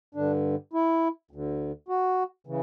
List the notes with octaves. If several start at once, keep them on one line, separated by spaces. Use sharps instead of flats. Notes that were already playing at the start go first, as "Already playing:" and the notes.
G2 D3 D4
E4
D2 D3
F#4
C#3 E3